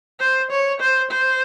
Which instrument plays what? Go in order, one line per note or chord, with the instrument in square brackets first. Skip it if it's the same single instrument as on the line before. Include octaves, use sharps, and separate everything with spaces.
[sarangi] C5
C#5
C5
C5